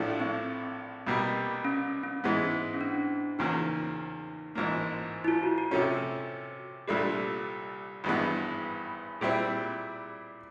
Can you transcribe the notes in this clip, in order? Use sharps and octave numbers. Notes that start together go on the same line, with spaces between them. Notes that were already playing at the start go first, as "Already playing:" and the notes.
Already playing: A#1 A2 F3 A3 D4
C4
C2 B2 G3 A#3
C#4
C#4
G#2 E3 G#3 B3
C#4
D4
E2 C#3 F3 A#3 D#4
A1 G#2 F3 A#3
E4
F4
F#4
F#4
C3 F3 A3 C#4 F#4
C2 A#2 F3 A3 D4 G4
G#1 G2 E3 G#3 B3
A#2 G3 C4 E4 G#4